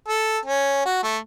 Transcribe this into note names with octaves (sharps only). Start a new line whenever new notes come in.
A4
C#4
F#4
A3